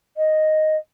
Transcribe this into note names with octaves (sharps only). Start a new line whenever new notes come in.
D#5